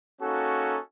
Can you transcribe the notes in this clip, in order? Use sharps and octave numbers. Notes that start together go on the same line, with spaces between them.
A#3 C#4 D#4 F#4 A4